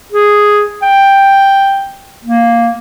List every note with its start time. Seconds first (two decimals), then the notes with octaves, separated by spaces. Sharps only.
0.12 G#4
0.82 G5
2.25 A#3